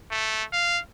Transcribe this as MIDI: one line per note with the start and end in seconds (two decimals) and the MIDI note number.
0.11 0.44 57
0.52 0.79 77